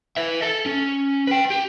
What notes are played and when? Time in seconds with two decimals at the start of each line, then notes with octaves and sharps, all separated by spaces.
0.17 B4 E5
0.42 A4 A5
0.66 C#4
1.27 B4 G5
1.50 G4